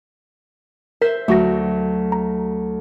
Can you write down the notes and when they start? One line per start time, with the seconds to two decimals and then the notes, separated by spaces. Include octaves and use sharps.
1.02 A#4 C5 E5 B6
1.28 D2 F#3 A3 F#4 A#6
2.12 A#5